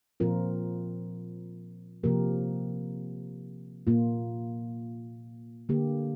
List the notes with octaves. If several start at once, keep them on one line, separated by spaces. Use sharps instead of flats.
A#2 F3 C4 F4 A#4
C3 F3 A#3 G4 A#4
A#2 A#3 F4
D3 A#3 G4